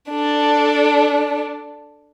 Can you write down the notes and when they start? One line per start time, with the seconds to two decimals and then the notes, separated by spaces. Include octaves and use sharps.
0.10 D4 A4